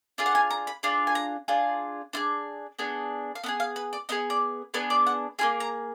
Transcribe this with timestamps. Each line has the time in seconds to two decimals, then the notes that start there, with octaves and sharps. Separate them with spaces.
0.18 D4 F4 G#4
0.26 F#5
0.35 G#5
0.51 A#5
0.67 B5
0.83 D4 F4 G#4
1.07 G#5
1.15 A#5
1.48 D4 F4 G#4
2.13 D4 F4 G#4
2.79 B3 D4 G#4
3.35 F5
3.44 B3 D4 G#4 F#5
3.60 F5
3.76 B4
3.93 D5
4.09 B3 D4 G#4 D#5
4.30 D5
4.74 B3 D4 G#4 B4
4.90 D5
5.07 F#5
5.39 A#3 F4 G#4 G#5
5.60 A#5